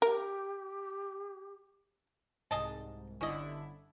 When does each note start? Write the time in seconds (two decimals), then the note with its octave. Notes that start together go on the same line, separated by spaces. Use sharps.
0.02 G4 A#4
2.51 C2 G#2 G#4 D#5 A5
3.21 G1 D3 C#4 E4 D#5